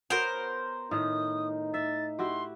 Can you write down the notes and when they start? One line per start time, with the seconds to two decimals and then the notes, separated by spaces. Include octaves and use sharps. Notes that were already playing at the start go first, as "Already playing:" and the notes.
0.10 B3 F#4 A#4 C5 C#5
0.91 A2 D#3 D#4 D#6
1.74 E5 A6
2.19 E4 F#4 G4 C6